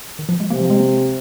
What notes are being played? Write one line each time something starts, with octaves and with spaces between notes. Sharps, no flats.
D#3
F3
G#3
C3 A#3
F3
G#3
A#3